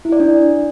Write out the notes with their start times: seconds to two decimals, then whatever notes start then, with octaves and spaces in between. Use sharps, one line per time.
0.05 E4
0.12 D5
0.20 D4